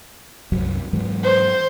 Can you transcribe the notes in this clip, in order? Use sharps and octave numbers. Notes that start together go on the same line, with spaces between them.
C2 F#2 F#3
G#2 E3 F#3
C5